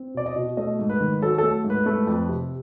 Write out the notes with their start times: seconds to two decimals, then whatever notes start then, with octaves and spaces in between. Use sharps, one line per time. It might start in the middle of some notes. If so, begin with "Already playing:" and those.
Already playing: C4
0.14 B2 D5
0.26 D#5
0.36 B2
0.57 A3 D#5
0.79 G#2
0.90 B4
1.01 D#3
1.22 F#3 A4
1.38 A3 A4
1.64 G#2
1.70 B4
1.86 A3
2.07 F2
2.29 C3